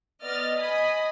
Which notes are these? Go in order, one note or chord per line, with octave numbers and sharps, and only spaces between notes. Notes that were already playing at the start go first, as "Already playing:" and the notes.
B3 D5 D#5 F6 A6
D#5 G#5 B5 D#6